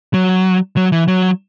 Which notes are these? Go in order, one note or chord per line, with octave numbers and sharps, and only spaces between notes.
F#3
F#3
E3
F#3